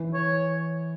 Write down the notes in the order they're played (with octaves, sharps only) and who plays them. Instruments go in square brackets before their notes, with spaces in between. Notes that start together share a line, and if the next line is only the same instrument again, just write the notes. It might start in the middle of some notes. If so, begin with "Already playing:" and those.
Already playing: [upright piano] E3
[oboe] C#5